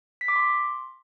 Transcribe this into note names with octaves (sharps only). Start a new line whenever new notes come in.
B6
D6
C6